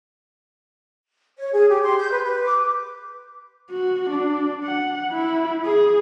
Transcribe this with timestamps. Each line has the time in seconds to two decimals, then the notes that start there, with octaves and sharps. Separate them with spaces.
1.38 C#5
1.53 G#4
1.69 G4
1.83 C6
1.98 G6
2.11 B4
2.24 B4
2.44 D6
3.70 F#4
4.10 D4
4.64 F#5
5.12 E4
5.65 G#4